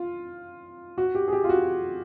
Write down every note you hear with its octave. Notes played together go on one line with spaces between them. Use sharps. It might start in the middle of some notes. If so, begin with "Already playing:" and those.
Already playing: F4
F#4
G4
G#4
G4
F4
F#4